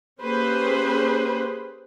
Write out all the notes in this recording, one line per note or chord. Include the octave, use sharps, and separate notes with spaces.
A#3 C#4 G4 G#4 B4 C5